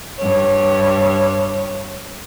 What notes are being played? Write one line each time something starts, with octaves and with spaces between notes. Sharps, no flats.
G2 C#5